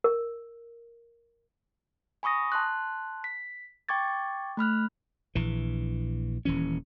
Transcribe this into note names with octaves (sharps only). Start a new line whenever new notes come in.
A#4
G#5 B5 C#6 D#6 A#6
A5 C6 F#6
B6
G5 C#6 D6 G#6 A6
A3 B5 F6 F#6
A#1 E3
D#1 E3 C#4